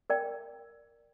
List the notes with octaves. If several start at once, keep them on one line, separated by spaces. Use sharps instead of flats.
A#4 D5 G5